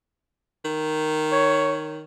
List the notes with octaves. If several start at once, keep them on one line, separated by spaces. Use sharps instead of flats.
D#3
C#5